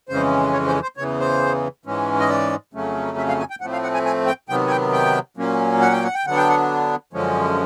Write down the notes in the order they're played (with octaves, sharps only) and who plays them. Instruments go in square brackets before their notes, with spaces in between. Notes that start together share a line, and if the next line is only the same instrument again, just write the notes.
[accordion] F2 C#3 E3 G#3 C#4 C5
C#5
C5
C5
E2 C#3 E3 C#5
C5
G#2 E3 G#3 C#4
D#5
D5
F2 C#3 F#3 A3 C#4
E5
F5
G#5
G5
A2 F3 A3 C4 F#5
F5
F#5
G#5
G#5
G5
C3 D#3 F#3 B3 G5
G#5
G5
G5
A#2 F#3 A#3 C#4
F#5
G5
F#5
G5
D3 F#3 B3 D4 F#5
G5
F#5
F#2 D3 F3 G#3 C#4